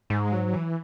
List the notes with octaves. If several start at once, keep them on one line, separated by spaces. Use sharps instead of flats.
G#2 G#3
F#3
E3